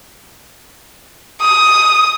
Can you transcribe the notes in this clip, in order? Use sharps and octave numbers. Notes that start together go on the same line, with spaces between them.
D#6